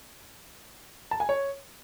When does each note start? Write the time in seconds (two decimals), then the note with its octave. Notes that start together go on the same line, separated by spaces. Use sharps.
1.11 A5
1.20 G#5
1.29 C#5